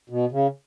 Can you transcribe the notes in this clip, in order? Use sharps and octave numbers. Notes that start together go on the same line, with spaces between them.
B2
C#3